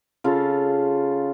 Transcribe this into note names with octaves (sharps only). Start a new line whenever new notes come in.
C#3 F4 A4